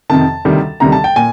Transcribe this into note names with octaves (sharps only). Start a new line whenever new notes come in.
F2 C3 D#3 A5
D2 C3 D#3 G3
D2 C3 D#3 G3 A#5
A5
G5
A#2 G#5